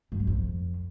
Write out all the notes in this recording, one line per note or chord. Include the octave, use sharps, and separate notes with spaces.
F#2
G2
F2